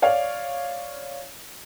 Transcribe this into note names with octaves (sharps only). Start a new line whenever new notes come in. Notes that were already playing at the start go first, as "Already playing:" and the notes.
C#5 D5 F5